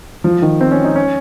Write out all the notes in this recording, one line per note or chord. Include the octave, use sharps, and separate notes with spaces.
F3
D#3
C4
C#4
D#4
C#4